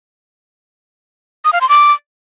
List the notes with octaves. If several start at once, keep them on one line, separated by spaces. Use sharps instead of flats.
D#6
F5
C6
D6